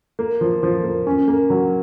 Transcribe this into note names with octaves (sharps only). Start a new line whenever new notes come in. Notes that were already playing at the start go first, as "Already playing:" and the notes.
A#3
F3
F3
A#3
C#4
A#3
F#3